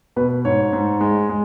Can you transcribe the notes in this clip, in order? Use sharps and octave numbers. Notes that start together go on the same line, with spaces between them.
B2 B4
G#2 C#5
G#2
G#3
G#3